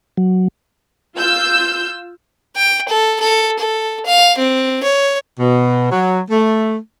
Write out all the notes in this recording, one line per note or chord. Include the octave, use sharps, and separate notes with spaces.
F#3
F4 E6 G6
G5
A4
A4
A4
F5
C4
C#5
B2
F#3
A3